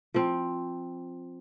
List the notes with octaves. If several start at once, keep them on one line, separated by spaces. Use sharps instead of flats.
F3 C4